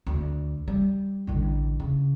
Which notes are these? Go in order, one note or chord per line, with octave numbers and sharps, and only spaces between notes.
D2
G3
A1 D3
C#3